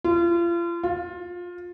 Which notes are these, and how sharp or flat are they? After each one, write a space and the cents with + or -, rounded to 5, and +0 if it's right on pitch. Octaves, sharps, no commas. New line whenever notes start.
F4 -35
F4 +20